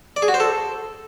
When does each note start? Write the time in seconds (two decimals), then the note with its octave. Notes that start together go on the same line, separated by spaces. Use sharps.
0.16 D5
0.22 G#4
0.28 F#4
0.34 C5
0.40 A4